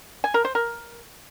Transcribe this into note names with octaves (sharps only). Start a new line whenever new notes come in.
G#5
A#4
C5
A#4